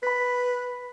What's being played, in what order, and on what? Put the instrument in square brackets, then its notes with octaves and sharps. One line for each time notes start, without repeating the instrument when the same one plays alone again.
[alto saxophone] B4 [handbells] B5 B6